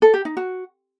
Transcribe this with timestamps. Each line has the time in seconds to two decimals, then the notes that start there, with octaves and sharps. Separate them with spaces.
0.02 A4
0.14 G4
0.25 D#4
0.37 F#4